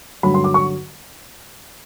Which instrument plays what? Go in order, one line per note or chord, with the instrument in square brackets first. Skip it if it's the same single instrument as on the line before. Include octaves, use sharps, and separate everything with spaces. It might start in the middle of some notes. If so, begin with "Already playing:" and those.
[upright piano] G2 D3 F#3 B5
C6
D6
C#6